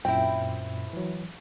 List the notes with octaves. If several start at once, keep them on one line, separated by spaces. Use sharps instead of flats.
F#2 A#2 C4 E4 G5
E3 F#3